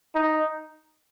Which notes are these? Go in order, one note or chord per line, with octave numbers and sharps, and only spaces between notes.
D#4